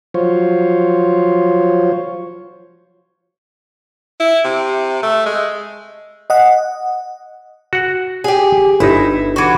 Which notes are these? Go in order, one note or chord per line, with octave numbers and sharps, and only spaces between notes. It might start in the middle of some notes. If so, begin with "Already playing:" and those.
F3 F#3 F4 C5 C#5
E4
C3
A3
G#3
D#5 F#5
F#4 F#5
G4 G#4
G1 D#4 E4
E3 F#4